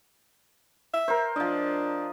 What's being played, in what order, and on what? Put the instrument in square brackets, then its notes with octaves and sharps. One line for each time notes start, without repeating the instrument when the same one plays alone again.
[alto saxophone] E5
[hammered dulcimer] A#4 C5
[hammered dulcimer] F3 D#5 [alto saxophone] D4